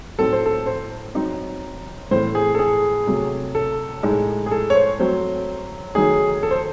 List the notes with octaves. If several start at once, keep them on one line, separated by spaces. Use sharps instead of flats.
A2 F#3 C4 D#4 A4
C5
A4
C5
F#3 C4 D#4
A2 E3 A3 C4 E4 C5
G#4
A4
G#4
C3 F#3 A3
A4
A2 G#3 D#4
G#4
A4
C#5
C5
F#3 A3 C4 C5
D#3 F#3 A3 D#4 G#4
A4
C5